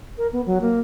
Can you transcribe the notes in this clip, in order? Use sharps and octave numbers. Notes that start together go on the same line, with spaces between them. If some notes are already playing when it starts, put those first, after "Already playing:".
A#4
B3
F#3
A#3